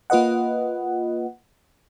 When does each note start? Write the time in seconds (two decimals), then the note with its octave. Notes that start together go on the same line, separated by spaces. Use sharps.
0.10 A#3 F4 B4 D#5 F#5